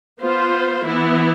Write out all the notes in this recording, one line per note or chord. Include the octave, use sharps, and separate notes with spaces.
B3 F4 C5
E3 B3 E4